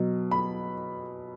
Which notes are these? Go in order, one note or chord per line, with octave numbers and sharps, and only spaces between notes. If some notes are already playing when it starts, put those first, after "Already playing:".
Already playing: B2 F#3
B5